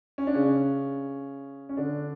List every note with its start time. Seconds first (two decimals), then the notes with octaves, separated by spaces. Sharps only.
0.18 C#4
0.27 D4
0.34 C#3 C#4
1.69 C#4
1.77 D3 D4